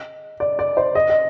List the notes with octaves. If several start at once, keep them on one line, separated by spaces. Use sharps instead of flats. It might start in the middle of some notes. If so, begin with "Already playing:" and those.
Already playing: D#5
D5
D5
C5
D#5
D#5